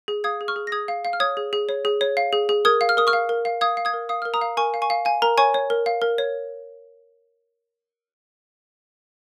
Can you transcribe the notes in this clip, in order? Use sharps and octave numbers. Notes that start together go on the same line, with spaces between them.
G#4
F5 D#6 G#6
G#4
C#6 F6
G#4
A#6
G#4 D#6 G#6
F5
F5
F6
C#5 D#6 G#6
G#4
G#4
C#5
G#4
C#5
F5
G#4
G#4
A#4 D#6 G#6
F5
F6
A#4 D#6
C#6 F6
F5
A#4
F5
F5 D#6 G#6
F5
D#6 G#6
A#4
F5 D#6
A#4 F6
A#5 D#6
F5
A#4 G#5 C#6
F5
G#5 C#6
F5
F5 G#5
A#4 A#5
C#5 G#5 C#6
C#5
A#4
F5
A#4
C#5